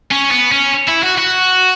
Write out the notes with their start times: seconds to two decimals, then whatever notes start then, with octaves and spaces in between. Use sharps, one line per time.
0.11 C#4
0.31 B3
0.52 C#4
0.88 E4
1.03 F#4
1.18 F#4